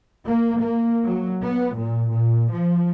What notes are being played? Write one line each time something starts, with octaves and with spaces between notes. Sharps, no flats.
A#3
A#3
F#3
B3
A#2
A#2
F3